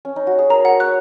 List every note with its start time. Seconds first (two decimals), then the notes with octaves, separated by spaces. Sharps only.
0.05 C#4
0.16 D#4
0.27 F#4
0.39 G#4
0.50 A#4 A#5
0.65 A#4 F#5
0.80 C#5 F#6